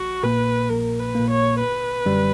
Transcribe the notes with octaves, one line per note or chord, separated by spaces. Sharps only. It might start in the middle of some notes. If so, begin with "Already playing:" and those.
Already playing: A#1 F#4
A#2 A#3 B4
A#1 A#4
B4
A#2 A#3
C#5
G1 B4
F#2 D3 G3